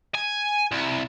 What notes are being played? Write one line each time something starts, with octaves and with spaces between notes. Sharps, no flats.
G#5
C2